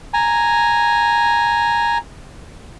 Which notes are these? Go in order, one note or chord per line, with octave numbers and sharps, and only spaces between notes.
G#5 A#5